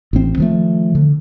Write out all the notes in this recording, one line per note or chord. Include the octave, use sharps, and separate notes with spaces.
A1 C4
D#3 F3 A3
D3